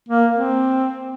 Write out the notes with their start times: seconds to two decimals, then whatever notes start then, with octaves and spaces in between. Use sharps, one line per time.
0.09 A#3
0.36 C4